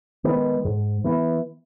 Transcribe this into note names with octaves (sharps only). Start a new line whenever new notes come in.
D#3 G#3 B3
G#2
E3 B3